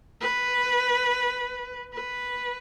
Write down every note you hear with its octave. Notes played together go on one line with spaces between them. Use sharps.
B4
B4